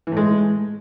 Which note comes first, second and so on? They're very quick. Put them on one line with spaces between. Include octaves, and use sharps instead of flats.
E3 A2 G#3